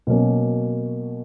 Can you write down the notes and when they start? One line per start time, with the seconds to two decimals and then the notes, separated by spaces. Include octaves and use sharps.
0.07 B2 F#3 A#3 C#4